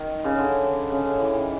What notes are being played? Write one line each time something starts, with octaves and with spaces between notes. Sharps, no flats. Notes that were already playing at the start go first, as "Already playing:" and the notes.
Already playing: D#3
C#3
D3
C#3
D3
E3
D#3